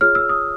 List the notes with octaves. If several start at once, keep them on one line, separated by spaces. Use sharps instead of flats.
F4 G#4 C#5 F6
E6
D#6